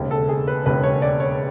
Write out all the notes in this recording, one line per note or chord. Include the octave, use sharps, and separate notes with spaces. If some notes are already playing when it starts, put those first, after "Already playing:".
Already playing: E1 D#2 C#3
A4
G#4
B4
E1 D#2 C#3 B4
C#5
D5
C#5